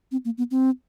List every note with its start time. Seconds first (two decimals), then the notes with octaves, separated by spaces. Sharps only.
0.12 C4
0.25 A#3
0.38 B3
0.51 C4